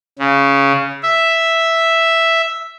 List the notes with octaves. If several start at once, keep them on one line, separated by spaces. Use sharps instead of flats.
C#3
E5